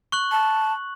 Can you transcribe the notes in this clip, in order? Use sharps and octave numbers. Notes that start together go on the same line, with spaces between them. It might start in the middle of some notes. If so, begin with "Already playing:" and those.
C#6 F#6 F#7
A5